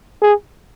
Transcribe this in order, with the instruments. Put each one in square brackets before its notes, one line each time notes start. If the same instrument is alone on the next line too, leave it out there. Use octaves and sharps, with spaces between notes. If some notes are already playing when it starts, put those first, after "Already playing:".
[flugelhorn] G#4